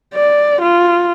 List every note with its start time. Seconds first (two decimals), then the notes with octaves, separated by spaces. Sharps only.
0.14 D5
0.61 F4